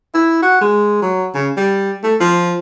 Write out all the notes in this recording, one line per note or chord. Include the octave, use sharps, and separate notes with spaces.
E4
F#4
G#3
F#3
C#3
G3
A3
F3